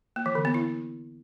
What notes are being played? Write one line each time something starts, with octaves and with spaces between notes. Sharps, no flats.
A#3
E3
D3
B3
E4